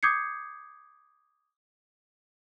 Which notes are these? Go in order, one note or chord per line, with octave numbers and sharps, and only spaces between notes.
D6 D#6 G6 G#6 C7 C#7